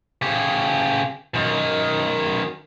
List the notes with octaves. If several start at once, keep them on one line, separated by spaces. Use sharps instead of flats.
C#3 G4
F#2 D#3